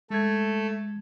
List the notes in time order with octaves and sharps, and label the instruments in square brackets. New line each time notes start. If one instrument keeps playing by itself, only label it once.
[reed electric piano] G#3 G#6 [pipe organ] A3 A4